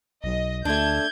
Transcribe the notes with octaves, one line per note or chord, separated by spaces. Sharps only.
B1 D#5
D2 A3 D4 G6 G#6